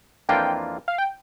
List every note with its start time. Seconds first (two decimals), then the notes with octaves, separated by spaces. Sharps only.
0.29 F2 E3 A#3 D4 F4 G5
0.88 F5
0.98 G5